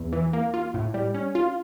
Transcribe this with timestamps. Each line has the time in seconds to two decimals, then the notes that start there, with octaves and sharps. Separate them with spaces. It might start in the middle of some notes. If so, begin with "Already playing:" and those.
Already playing: E2
0.13 E3
0.33 A#3
0.54 F4
0.74 A2
0.94 G3
1.14 C#4
1.35 F4